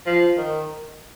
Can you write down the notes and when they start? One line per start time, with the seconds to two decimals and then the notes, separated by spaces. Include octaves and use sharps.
0.06 F3
0.38 D#3